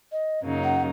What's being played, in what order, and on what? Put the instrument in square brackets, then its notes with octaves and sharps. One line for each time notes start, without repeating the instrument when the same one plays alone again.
[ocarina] D#5
[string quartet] F#2 C#3 F#3 A#3 D#4
[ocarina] F#5